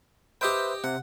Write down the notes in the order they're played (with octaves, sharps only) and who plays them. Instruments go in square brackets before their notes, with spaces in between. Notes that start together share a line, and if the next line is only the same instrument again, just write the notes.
[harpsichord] G4 D#5 G5 [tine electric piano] B4 C5 E5
[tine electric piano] C3 [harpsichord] F#5